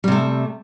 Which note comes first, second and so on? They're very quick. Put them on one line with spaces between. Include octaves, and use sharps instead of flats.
G3 C3 A3